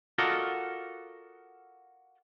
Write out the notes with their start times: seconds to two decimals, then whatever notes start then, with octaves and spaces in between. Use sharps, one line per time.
0.18 F4 F#4 A4 A#4 D5 D#5